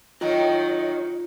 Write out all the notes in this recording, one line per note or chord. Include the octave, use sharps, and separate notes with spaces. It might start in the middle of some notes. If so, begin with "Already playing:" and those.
A2 D#3 F#3 D#4 F4 C#5 D#5